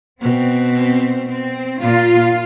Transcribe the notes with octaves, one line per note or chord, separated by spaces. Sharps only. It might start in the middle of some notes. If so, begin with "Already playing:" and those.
B2 C4
C4
C4
A#2 F4